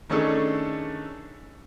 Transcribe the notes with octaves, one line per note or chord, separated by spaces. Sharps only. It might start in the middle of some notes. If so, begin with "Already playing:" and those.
D#3 A3 C#4 D4 G#4 A4